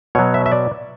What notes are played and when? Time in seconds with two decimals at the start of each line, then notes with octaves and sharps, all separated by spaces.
0.15 B2 F#3 C#5
0.34 E5
0.46 E5
0.52 D5